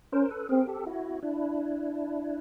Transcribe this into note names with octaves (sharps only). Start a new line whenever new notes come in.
C#4 A#4 C5
A4 B4
C4 G#4 A#4
G4 A4
E4 F#4
D4 E4